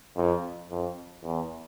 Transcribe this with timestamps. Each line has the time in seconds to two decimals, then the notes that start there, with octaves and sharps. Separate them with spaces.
0.17 F2
0.70 F2
1.24 E2